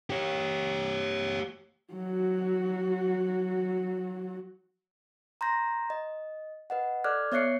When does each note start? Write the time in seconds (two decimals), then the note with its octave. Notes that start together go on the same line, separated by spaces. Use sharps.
0.10 G4 C#5
1.93 F#3 F#4
5.41 A#5 C6 G6 A#6
5.90 D#5
6.70 B4 D#5 F#5
7.04 A4 D5 D6 F6 F#6 G#6
7.32 B3 C#5 E5 F#6 C7 C#7